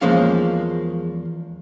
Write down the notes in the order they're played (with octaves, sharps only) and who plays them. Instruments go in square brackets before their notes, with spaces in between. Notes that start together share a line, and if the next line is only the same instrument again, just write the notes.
[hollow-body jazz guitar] E2 F3 G#3 A#3 C#4 F5